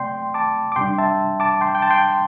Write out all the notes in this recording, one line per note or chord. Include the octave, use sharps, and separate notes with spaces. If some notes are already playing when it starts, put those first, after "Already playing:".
Already playing: C3 A3 C4 D5 G5 C6
A5 D6
D6
C3 G3 D4 G5 C6
E5 A5
A5 D6
G5 C6
G5
A5
G5 C6